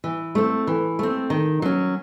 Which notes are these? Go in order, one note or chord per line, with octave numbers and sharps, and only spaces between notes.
E3
A3 C4
E3
A3 C4
D#3
F#3 C#4